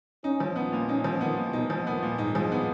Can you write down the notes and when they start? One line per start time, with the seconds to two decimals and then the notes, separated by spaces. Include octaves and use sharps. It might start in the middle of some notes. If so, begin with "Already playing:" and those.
0.24 C#4 D#4
0.40 F3
0.56 B3
0.73 A#2
0.89 C#4 D#4
1.04 F3
1.21 D#3 B3
1.37 A#2
1.53 B2 D#4
1.70 F3
1.86 A#2 B3
2.02 A#2
2.18 G#2 D#4
2.35 F3
2.52 B3